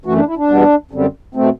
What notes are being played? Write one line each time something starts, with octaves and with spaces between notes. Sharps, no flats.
F#2 E3 A3 F#4
D4
E4
D4
E2 B2 G3 B3
F#2 D3 G3 C4
B2 A3 C4